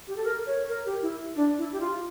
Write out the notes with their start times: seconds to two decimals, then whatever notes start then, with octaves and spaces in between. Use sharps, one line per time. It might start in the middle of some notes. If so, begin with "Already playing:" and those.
0.08 G4
0.16 A4
0.24 A#4
0.46 C#5
0.69 A#4
0.86 G4
1.02 E4
1.36 D4
1.58 E4
1.72 G4
1.80 F4